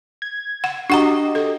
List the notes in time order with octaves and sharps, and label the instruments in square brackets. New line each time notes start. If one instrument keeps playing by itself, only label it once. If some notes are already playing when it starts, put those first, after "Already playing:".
[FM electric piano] G#6
[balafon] F#5
[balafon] D4 F#5 A#5 [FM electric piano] F#4 G4 D#5
[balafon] A4